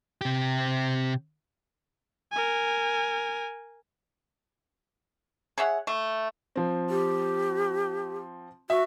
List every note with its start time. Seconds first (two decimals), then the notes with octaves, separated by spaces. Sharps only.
0.21 C3 G4
2.32 A#4 G#5
5.58 G#4 C#5 E5 F#5
5.87 A3
6.56 F3 C4
6.90 G4
8.70 F#4 E5